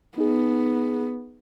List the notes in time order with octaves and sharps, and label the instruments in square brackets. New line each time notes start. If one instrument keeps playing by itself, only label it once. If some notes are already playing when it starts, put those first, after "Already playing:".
[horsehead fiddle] B3 [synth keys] D#4 G#4